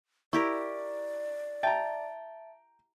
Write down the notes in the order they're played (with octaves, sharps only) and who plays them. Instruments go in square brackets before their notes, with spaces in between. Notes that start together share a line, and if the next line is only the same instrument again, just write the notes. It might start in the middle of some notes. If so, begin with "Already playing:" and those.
[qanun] E4 G4 A#4 [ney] D5 [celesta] C#6
[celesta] E5 A5 A6 [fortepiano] G5 A#5